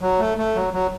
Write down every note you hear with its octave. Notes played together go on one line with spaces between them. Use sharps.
F#3
A3
A3
F#3
F#3